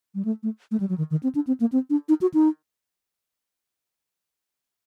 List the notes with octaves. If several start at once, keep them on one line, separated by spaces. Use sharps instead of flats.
G3
A3
A3
A3
G3
F#3
D#3
D#3
C4
D4
C4
A#3
C4
D4
D#4
F#4
D#4